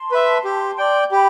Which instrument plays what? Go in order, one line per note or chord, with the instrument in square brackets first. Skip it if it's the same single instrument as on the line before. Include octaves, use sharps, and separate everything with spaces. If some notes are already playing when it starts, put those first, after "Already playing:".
Already playing: [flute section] A5 C6
[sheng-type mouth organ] B4 E5
G4
D5 G5
[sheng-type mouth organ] G4 [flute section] G5 B5